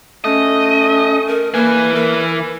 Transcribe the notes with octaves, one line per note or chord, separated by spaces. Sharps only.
A3 C#4 D#5
A#4
E3 A#3 B4 G#5
A#4